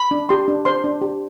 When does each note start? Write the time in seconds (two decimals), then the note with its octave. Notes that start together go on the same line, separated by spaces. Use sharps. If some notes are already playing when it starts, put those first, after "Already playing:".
Already playing: B5
0.11 D4
0.29 G4 C6
0.48 D4
0.65 C5 C6
0.84 D4
1.01 G4